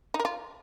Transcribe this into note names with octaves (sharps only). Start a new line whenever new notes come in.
D#4
A#4
F4